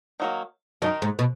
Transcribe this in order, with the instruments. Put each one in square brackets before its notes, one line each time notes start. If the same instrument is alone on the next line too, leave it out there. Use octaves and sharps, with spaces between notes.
[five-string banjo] D#3 F#3 A#3
[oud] F#2 [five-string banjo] D#3 A#3 D#4 A#4
[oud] G#2
B2